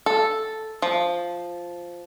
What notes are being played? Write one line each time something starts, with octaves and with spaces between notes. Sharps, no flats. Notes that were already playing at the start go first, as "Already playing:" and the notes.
A4
F3